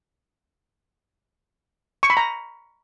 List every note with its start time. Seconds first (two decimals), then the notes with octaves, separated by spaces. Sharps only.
2.03 C#6
2.10 B5
2.17 A#5